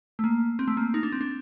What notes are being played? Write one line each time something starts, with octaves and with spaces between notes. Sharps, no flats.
A3
A#3
C4
A3
A#3
D#4
D4
C4
D4